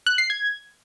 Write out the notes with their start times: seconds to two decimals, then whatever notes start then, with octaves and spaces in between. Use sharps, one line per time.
0.07 F#6
0.18 C7
0.30 G#6